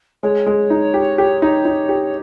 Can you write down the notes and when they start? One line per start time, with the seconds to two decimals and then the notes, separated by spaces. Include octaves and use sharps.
0.23 G#3 C#5
0.46 G#3
0.70 D#4
0.94 G4
1.18 G4
1.42 D#4
1.65 D#4
1.89 G4